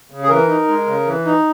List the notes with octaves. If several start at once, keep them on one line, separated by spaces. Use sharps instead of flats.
C#3
G#4
E3 A#4
D#4
G#3
C#3
E3
D#4